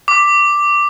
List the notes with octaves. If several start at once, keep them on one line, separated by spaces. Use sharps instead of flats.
D6